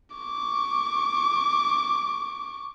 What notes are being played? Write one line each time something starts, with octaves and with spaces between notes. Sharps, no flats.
C#6 D6